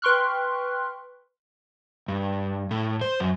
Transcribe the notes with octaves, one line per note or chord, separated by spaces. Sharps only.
B4 G5 C6 C#6 F6 F#6
G2
A2
C5
F#2